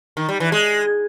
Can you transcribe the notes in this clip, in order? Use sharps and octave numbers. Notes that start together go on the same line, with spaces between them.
D#3
G3
E3
G#3